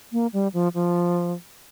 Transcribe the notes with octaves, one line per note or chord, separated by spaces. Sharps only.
A#3
G3
F3
F3